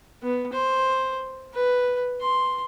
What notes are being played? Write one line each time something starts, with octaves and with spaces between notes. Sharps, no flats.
B3
C5
B4
C6